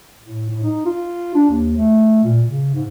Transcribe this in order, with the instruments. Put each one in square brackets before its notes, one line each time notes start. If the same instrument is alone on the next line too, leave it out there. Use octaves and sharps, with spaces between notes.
[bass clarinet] A2
A2
D#4
F4
D4
D#2
A3
A#2
C#3
G#2